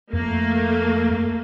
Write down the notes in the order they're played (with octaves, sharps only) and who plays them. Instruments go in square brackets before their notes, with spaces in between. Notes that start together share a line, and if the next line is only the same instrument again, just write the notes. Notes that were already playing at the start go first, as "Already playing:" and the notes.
[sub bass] F2 [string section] A3 A#3